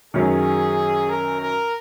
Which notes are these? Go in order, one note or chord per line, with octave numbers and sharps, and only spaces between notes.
F#2 D#3 F#3 C#4 G#4
A#4
A#4